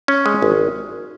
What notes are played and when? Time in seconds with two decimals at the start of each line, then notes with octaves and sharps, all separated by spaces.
0.08 C#4
0.26 G#3
0.42 G#1